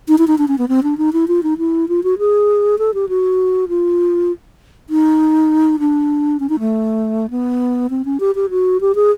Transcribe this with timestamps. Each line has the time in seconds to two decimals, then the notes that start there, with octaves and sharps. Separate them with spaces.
0.08 D#4
0.18 E4
0.27 D#4
0.38 D4
0.48 C#4
0.58 B3
0.68 C4
0.83 D4
0.98 D#4
1.13 E4
1.28 F4
1.43 D#4
1.58 E4
1.89 F4
2.04 F#4
2.19 G#4
2.79 A4
2.94 G4
3.09 F#4
3.69 F4
4.90 D#4
5.80 D4
6.40 C#4
6.49 D#4
6.60 A3
7.30 B3
7.90 C4
8.05 C#4
8.20 G4
8.35 G4
8.50 F#4
8.81 G4
8.95 G#4